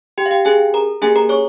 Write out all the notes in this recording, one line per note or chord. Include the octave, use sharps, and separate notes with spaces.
G4 G5
F5
G4 G5
C#4 G4 G#4 G#5
A#4 A#5
A#3 C#4 G4 G#4 G#5
A#4 A#5
C#5 C#6